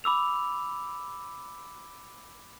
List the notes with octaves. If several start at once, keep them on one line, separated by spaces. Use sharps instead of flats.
B5 D6 E6 F7